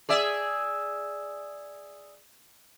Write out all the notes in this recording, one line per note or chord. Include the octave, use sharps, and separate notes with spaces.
G#4 D5 E5